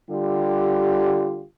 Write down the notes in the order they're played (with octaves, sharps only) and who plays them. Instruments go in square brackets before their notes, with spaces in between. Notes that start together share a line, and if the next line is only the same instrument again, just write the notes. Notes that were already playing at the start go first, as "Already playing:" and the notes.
[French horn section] D3 G3 F4 G4